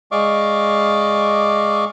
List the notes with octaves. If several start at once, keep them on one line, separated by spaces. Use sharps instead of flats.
G#3 D5 D#5 F5 C#6 D6